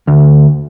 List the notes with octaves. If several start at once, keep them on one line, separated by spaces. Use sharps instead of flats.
D2